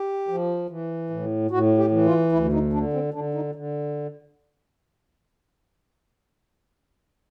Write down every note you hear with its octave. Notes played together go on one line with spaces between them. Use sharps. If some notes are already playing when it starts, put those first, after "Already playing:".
Already playing: G4
F3
E3
A2
A2 F#4
G4
E3
F4
D2 E4
D#4
D3 D4
C4
D3 D4
D#4
D3